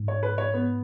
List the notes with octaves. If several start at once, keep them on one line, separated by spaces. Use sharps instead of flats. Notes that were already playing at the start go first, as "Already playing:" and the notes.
Already playing: G#2
C#5
B4
C#5
B3